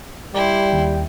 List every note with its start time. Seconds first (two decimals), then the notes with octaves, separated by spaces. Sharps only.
0.34 G3 E4 D5 G5 C6
0.73 D#2